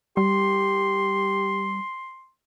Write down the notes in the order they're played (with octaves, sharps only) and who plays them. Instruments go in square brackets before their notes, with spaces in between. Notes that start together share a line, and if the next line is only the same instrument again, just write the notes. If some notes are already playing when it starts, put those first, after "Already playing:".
[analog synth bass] G3 [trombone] G4 [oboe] C6